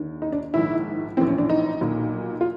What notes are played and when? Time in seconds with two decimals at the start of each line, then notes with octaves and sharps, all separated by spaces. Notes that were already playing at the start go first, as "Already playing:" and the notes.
Already playing: D#2 D3
0.22 D#4
0.32 D4
0.54 A#1 G#2 D#3 E4
1.17 A#1 A2 E3 C4
1.27 C#4
1.38 D4
1.50 D#4
1.81 B1 A#2
2.41 F4